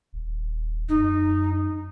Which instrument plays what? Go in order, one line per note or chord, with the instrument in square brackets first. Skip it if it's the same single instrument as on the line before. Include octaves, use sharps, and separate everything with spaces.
[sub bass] D#1
[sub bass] F#2 [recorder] D#4